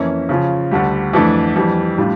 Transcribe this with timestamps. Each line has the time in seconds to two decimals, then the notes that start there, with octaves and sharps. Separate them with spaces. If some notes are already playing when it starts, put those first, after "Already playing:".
Already playing: F2 E3 A#3 C#4 E4
0.29 C#3 F3 C#4 F4
0.71 D2 D3 G3
1.13 F2 E3 A3 D4
1.56 F2 E3 G3
1.98 A2 G3 D4 F4